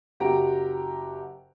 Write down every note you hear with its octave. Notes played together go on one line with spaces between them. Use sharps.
F#1 F#4 G4 F#5 A#5 D7